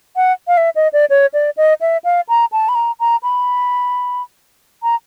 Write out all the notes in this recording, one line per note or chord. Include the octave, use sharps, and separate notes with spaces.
F#5
F5
E5
D#5
D5
C#5
D5
D#5
E5
F5
A#5
A5
B5
A#5
A#5
B5
A#5